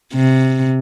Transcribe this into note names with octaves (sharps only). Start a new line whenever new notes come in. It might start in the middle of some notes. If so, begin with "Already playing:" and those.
C3